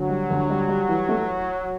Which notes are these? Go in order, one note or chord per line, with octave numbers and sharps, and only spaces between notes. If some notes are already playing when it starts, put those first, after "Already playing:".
Already playing: D2 F#3
G3
D2
G3
G3
E3
A3